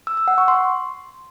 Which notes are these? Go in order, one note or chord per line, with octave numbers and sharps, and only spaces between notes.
E6
E6
F#5
C#6
C6